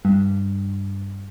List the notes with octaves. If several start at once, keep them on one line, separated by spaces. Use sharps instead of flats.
G2